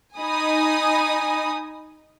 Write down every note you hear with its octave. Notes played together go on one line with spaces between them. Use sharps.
D#4 G#5 B5 D#6